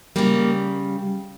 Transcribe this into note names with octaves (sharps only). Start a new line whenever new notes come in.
C#3 G3 A#3